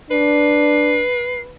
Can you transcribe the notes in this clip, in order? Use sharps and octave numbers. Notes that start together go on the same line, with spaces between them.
D4 B4 C7